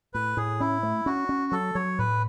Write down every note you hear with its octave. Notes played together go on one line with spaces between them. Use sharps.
A2 B4
A2 G#4
C#4 E4
A3
C#4 F#4
C#4
F#3 A4
F#3 C#5
A2 B4